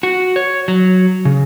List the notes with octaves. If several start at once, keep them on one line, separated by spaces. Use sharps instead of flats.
F#4
C#5
F#3
C#3